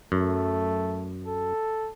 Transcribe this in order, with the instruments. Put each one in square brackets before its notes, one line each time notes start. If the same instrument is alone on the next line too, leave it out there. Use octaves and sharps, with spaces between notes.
[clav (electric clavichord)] F#2 [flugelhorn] A3
[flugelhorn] A4